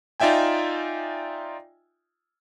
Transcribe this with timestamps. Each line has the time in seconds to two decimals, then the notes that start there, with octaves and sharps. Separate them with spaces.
0.20 D#4 F4 D5 E5 G5 G#5